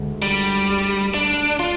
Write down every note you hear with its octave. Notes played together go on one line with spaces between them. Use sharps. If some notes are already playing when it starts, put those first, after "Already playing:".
Already playing: D2 D3 G#3
G3
D4
F4